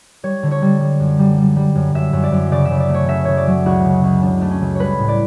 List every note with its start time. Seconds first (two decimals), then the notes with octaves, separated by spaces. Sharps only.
0.23 G3 C#5
0.43 D3
0.51 C#5
0.62 G3
0.80 G3
1.00 F#2
1.19 G3
1.38 G3
1.56 G3
1.75 F#2
1.94 F#2 E5
2.13 F#2
2.23 D5
2.32 F#2
2.51 C#3 D5
2.65 E5
2.71 C#3
2.80 D5
2.89 A3
2.94 C#5
3.08 C#3 E5
3.25 C#3 C#5
3.37 D5
3.47 F#3
3.66 C#2 F#4
3.85 C#3
4.04 C#2
4.22 C#2 D4
4.41 A3 D4
4.51 C#4
4.61 C#2
4.75 G3 B4 C#5
4.98 A2
5.08 D5